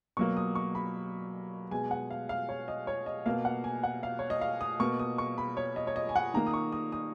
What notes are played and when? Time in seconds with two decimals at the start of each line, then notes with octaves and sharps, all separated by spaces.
0.17 B2 F#3 A#3 C#6
0.37 D#6
0.55 C#6
0.75 B5
1.71 B2 G#3 G#5
1.91 F#5
2.10 F5
2.29 F5
2.49 C#5
2.68 D#5
2.87 C#5
3.06 D#5
3.26 B2 A#3 F5
3.45 F#5
3.64 G#5
3.83 F#5
4.03 F5
4.19 C#5
4.30 D#5
4.41 F5
4.61 D#6
4.80 B2 A#3 C#6
4.99 D#6
5.18 C#6
5.38 B5
5.57 C#5
5.76 D#5
5.87 C#5
5.96 D#5
6.09 G#5
6.16 F#5
6.34 D#3 A#3 A#5
6.47 D#6
6.54 C#6
6.72 D#6
6.92 D#6